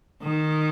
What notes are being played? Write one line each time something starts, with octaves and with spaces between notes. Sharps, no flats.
D#3